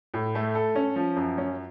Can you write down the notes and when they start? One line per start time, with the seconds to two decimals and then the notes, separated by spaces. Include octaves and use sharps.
0.14 A2
0.35 A3
0.55 A4
0.75 C#4
0.96 F3
1.16 F#2
1.38 C#4